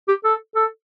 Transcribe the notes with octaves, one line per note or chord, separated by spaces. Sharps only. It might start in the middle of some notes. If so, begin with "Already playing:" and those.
G4
A4
A4